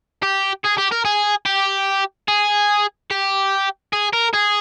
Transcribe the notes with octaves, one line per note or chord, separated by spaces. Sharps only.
G4
G#4
G4
A#4
G#4
G4
G#4
G4
G#4
A#4
G#4